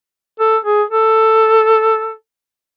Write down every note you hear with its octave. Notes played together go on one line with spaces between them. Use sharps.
A4
G#4
A4